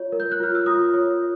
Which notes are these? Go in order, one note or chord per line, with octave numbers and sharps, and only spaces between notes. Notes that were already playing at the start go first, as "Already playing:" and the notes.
Already playing: F4 C#5
A#4
G6
F#6
F4 F6
E6
F4 D#6
C#5